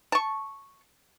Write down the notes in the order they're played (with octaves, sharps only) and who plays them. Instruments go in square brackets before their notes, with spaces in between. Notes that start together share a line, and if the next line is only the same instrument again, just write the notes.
[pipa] A5 C#6